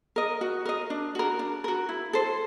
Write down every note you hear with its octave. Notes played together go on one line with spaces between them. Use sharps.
A#4 D#5
F#4
A#4 D#5
D4
F#4 A#4
D4
F#4 A#4
E4
A4 C5